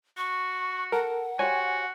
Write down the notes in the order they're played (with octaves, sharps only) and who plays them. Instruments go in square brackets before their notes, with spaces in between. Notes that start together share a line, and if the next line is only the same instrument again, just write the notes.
[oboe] F#4 [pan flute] C#6
[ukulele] A4 [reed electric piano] A#4 [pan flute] F#5
[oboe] F#4 [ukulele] G4 C5 C#5 [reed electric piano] G#5